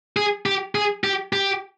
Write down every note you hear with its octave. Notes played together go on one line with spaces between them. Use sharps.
G#4
G4
G#4
G4
G4